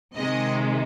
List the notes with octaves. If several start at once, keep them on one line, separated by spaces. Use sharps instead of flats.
C3 D#3 G#3 D#5